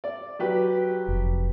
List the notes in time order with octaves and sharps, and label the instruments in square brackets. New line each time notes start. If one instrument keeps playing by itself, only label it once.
[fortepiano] D5
F#3 G4 B4
[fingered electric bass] F1